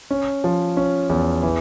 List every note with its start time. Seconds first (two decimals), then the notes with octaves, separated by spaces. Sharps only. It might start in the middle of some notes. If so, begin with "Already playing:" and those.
0.11 C#4
0.44 F3
0.77 C#4
1.10 E2
1.43 E3